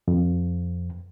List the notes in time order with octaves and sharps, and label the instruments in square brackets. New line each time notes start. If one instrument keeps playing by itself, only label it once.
[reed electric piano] F2